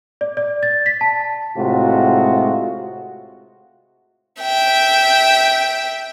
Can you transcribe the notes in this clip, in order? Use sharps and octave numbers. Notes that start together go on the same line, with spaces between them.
D5
D5
A6
B6
A5
A2 C3 G#3 F4 F#4
E5 G5